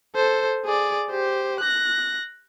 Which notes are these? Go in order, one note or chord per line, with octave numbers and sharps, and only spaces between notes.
A4 C5
G#4 D5
G4 C5
F#6 A#6